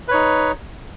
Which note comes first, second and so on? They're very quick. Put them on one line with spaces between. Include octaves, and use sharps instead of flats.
B4 C#5 D#4